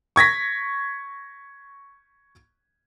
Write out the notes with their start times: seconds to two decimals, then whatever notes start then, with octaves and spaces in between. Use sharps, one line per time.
0.16 C#6 G#6 A#6 B6